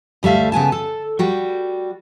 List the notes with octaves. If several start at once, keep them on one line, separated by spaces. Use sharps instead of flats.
D2 G3 A3 E5 F5
C#3 B3 G#5 A5
A4
G3 F#4 G5